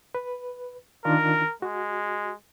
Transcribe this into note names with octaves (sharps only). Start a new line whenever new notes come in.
B4
D#3 D4 F4 A#4
G#3 F#4